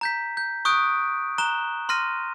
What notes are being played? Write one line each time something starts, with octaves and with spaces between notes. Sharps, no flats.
A#5 G6 B6
G6
C#6 D#6 F#6 G6 D7
A#5 F#6 E7 G7
C6 F6 A#6 D#7